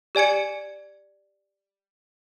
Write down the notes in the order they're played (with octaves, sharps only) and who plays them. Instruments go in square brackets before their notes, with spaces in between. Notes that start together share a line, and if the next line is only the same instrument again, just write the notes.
[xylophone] G4 D5 G#5 G#6 C#7